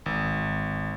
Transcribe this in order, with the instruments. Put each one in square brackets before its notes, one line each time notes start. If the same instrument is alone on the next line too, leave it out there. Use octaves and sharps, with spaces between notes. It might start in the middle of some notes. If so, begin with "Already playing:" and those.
[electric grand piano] G#1